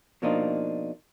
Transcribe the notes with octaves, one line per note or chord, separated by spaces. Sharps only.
B2 F3 A#3 D4 D#4 F4